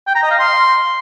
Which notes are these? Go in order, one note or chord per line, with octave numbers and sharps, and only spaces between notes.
G5
A#5
D#5
F5
C6